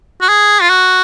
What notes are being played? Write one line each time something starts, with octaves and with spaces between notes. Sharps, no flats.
F#4
G#4
F4
F#4